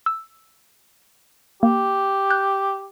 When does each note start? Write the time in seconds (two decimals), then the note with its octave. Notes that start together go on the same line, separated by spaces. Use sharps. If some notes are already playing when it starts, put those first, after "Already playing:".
0.06 E6
1.63 A#3 G4
2.30 F#6 G6